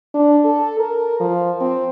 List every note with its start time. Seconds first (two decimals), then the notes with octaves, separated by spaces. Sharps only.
0.14 D4
0.45 A4
0.79 A#4
1.20 F3
1.61 C4